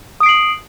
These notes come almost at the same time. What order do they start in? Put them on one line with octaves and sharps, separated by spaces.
D#6 D7 C7 F#7